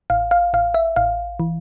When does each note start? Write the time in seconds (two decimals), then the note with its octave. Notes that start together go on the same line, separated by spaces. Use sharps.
0.10 A1 F5
0.31 F5
0.53 A1 F5
0.74 E5
0.96 A1 F5
1.40 E3